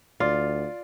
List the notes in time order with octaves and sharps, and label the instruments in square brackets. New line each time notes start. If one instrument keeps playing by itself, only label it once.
[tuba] D2 [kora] F4 [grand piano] D5